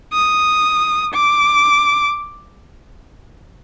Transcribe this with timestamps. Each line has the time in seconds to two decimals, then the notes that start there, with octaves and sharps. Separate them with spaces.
0.14 D#6
1.14 D6